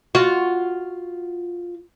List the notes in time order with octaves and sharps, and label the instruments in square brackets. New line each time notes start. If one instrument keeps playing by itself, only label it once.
[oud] F4 F#4